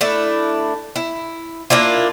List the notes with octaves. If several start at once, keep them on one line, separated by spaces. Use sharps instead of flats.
A3 D4 E4
E4
A#3 D4 E4 F4